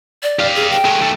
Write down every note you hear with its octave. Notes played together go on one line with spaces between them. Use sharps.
D5
G4 F5
G#4
G5
A3 G#4
D#2 A3